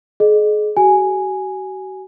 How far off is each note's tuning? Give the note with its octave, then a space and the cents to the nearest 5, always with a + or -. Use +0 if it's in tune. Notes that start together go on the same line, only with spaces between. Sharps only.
G#4 +35 D#5 -25
F#4 +40 G#5 +0